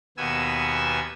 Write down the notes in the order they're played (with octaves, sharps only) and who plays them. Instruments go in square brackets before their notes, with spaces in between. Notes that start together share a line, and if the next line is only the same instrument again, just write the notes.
[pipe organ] D#2 B2 B3 G#5 E6